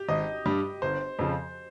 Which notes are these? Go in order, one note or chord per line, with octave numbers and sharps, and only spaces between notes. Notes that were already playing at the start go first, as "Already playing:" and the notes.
Already playing: G4
G#1 D#5
G2 G3
G1 C5
F2 C#3 F3